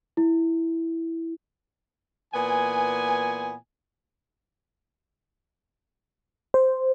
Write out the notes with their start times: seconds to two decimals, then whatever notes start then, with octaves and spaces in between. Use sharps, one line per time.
0.17 E4
2.33 A#2 E3 B3 G#5
6.54 C5